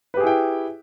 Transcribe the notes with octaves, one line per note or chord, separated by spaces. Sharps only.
E4 G4 G#4 B4 G5